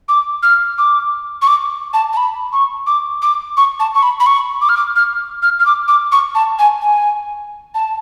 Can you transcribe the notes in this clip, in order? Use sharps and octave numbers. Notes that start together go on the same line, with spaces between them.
D6
F6
D6
C#6
D6
A5
A5
B5
C#6
D6
D6
C#6
A5
C#6
B5
B5
C#6
D6
F6
D6
F6
F6
F6
D6
D6
C#6
A5
G#5
G#5
A5